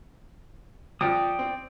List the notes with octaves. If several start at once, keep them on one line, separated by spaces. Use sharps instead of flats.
F2 D5 G5 D#6
C4